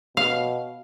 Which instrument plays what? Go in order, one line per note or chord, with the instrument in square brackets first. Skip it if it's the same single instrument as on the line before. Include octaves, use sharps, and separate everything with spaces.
[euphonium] B2 [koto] F5